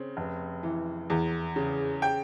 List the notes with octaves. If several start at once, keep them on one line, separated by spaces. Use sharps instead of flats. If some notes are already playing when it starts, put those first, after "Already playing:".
Already playing: C#3 C4
F1
E3
E2
C#3
G5